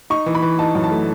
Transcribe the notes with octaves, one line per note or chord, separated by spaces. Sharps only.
D#4 C#6
E3
B5
E3
D#4 A5
F#2
A5
A3